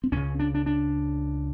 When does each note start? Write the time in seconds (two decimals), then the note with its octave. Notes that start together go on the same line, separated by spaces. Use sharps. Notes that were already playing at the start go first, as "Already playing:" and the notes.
0.04 C4
0.12 C#2 C#3 C#4
0.39 D4
0.54 D4
0.66 D4